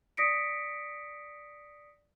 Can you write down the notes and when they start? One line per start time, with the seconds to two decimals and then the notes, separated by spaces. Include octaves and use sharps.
0.17 D5 D#6 A#6 B6 C#7 D7